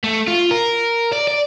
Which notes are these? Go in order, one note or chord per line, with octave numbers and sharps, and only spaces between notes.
A3
F4
A#4
D5
D5